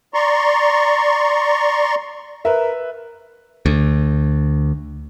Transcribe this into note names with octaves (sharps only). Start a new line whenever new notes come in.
D5 A#5 C6 C#6
A#4 B4 E5
D2